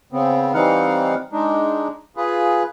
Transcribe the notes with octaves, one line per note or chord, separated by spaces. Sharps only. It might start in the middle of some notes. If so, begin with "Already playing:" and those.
C#3 B3 C4
E3 G3 C4 D#4 F5 F#5
G#3 D4 D#4
F4 G#4 B4